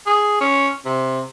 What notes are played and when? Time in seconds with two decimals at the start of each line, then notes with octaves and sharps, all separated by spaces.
0.07 G#4
0.41 C#4
0.85 C3